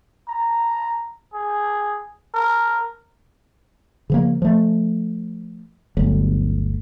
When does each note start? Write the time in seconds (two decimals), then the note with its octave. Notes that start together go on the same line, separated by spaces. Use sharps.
0.29 A#5
1.34 G#4
2.35 A#4
4.10 C#3 F3 A#3
4.42 F3 A3
5.97 G1 D2 F#3